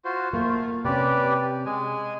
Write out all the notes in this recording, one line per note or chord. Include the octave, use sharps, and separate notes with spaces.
F4 F#4 C5
A3 A#3 F4
C3 C#4 G4 B4 D5
G#3 G#4 G#5